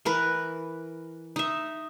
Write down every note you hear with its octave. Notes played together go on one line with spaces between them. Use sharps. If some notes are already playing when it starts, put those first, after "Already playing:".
E3 A#4 B4
D#4 E5